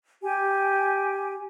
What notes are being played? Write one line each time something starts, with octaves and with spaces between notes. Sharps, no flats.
G4 G#5